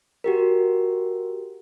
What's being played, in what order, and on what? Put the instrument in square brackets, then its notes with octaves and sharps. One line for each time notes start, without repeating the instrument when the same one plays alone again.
[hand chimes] F#4 G4 A#4